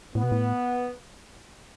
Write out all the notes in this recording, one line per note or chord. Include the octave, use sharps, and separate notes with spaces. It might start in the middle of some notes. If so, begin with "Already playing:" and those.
A2 B3
B2
A2